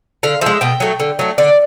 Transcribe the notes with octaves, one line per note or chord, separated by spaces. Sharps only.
D3 F5
F3 G#3 E5
B2 G5
F#3 A3
D3
F#3 A3
D3 D5